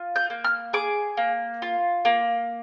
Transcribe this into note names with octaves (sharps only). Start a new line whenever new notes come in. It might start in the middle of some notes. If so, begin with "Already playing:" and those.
Already playing: F4
G6
A#3
F6
G#4 D6
A#3
F4
A#3